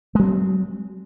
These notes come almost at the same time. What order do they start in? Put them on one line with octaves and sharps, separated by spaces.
G#3 F#3 C4